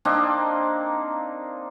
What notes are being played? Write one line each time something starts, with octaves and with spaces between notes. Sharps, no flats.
A#3 C4 D4 D#4